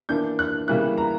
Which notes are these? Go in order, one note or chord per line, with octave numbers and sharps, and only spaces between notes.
E3 A#3 D4 G6
F#6
C#3 E3 G3 A#3 E4 F#6
A#5